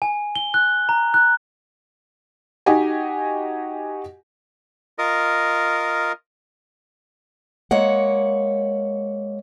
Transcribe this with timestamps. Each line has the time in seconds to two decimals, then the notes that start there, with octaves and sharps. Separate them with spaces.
0.02 G#5
0.36 G7
0.54 F#6
0.89 A#5
1.14 F#6
2.66 D#4 F#4 G4 D#5 G#5
4.99 F4 A#4 D#5
7.71 G#3 A#3 C#5 F#5